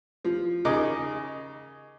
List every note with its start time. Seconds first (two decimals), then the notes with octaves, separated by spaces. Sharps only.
0.24 F3
0.65 C#3 D#4 A#4 D6